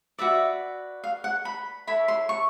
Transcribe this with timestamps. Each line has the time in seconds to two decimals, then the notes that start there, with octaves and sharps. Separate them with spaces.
0.19 F#4 B4 D5 E5
1.04 F5
1.24 F#5
1.45 B5
1.87 E4 A4 C#5 B5
2.08 C6
2.29 C#6